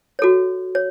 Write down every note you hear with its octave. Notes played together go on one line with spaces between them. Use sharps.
F#4 A4 C#5
C#5